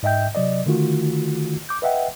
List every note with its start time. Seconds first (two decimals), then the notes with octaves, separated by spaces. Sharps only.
0.03 G#2 D#5 E5 G5 G6
0.35 C3 F#3 D5 D#5
0.66 D3 D#3 A3 F4 F#4
1.69 D6 G6
1.82 B4 D#5 E5 F#5 G5